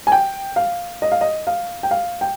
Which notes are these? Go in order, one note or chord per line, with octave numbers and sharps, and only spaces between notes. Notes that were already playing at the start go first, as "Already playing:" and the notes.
G#5
G5
F5
D#5
F5
D#5
F5
G5
F5
G5